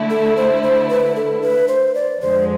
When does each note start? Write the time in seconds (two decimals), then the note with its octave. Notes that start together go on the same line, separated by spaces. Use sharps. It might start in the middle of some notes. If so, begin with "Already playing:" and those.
Already playing: D3 A3 E4
0.10 A4
0.37 C5
0.63 C5
0.89 B4
1.16 A4
1.42 B4
1.68 C5
1.95 D5
2.21 F2 D3 F3 G#3 C5